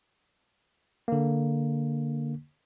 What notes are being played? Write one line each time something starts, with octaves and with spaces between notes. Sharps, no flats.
D3 A#3